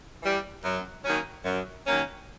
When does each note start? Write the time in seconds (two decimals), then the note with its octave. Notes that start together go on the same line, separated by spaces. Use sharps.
0.23 E3 G3
0.64 F#2
1.05 D#3 F#3 A#3 C#4
1.45 F#2
1.87 D#3 F#3 A#3 C#4